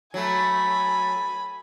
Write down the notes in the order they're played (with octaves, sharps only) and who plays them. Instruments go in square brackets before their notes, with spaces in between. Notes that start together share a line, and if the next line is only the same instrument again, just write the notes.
[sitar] F#3 A3 [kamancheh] G#5 B5